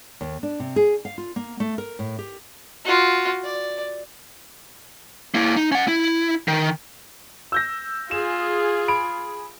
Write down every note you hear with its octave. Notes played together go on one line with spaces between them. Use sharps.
D#2
D4
C3
G#4
F5
F4
A#3
A3
A#4
A2
G4
F4 F#4
D5
A#3 E4
D#4
C#4 F#5
E4
D#3
E6 G6 A#6
F4 G#4 E7
B5 D7